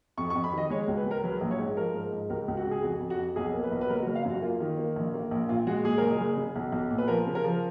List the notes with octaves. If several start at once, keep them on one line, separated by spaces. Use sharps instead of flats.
F2 C#6
C#6
F2
B5
D#3
D#5
G#3 C#5
C#2
B4
G#3
A#4
F#3 B4
A#1
C#5
G#2
F3 A#4
G#2
G#2
C#2 A#4
C#2
F#4
C#3
G#4
F2 F#4
F2
F#4
F2
B1 G#4
A#3
B4
B1
B4
F#1 A#4
F#4
F#1
F5
F#2
F#4
A#3 F4
D#3
A#3
A#1
A#3
A#1
A#2 F4
G#3 F#4
A#2 G#4
F#1 A#4
G#4
F#1
C#3
B1
B1
A#2
B4
F3 A#4
C#3
A#4
F3